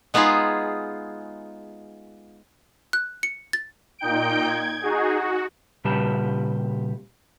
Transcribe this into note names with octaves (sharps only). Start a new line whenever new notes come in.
G#3 B3 D#4 F4 G#4
F#6
C#7
A6
A#2 D#4 G5 G6 D7
G#6
D#4 F#4 G#4
F#4
A#2 C#3 G3 G4 B4 A5